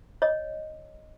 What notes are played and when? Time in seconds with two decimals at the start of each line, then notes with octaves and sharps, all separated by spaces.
0.22 C#5 D#5